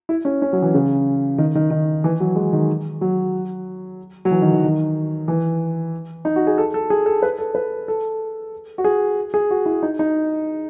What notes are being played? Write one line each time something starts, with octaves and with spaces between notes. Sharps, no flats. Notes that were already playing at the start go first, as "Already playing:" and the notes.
E4
C#4
C#4
F#3
E3
C#3
D#3
D#3
D#3
E3
F#3
G#3
D#3
F#3
F#3
E3
D#3
D#3
D#3
E3
D#4
F#4
G#4
A4
A4
G#4
A4
B4
A4
B4
A4
F#4
G#4
G#4
F#4
E4
D#4
D#4